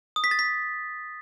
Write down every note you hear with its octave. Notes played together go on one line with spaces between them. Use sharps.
D#6
B6
A6
B6